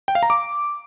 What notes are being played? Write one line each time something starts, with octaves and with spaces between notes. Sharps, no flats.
G5
F5
A#5
D6